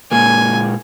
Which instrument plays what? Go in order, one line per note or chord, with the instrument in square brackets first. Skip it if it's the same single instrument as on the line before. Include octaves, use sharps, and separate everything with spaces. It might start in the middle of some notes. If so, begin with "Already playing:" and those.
[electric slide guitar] A#2 G#3 A#3 [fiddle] G#5